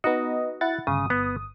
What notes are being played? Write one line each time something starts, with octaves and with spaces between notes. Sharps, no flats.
B3 D#4 F#4 D#5
E4 F#5 A6
G1 C#3 D#6
B3